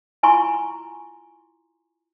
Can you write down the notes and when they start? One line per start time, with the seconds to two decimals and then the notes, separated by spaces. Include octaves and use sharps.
0.23 E4 F4 G#5 A#5 C6 C#6